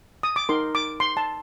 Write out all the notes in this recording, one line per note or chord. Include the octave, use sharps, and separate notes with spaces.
D#6
D6
D#4 A#4 C6
D6
C6
A5